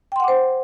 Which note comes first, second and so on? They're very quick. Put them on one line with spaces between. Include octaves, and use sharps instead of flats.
G5 C6 F#5 D6 C5